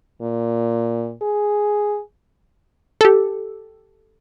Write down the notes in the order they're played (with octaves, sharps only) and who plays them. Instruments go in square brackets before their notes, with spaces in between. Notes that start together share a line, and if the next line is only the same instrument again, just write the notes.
[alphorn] A#2
G#4
[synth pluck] G4 A4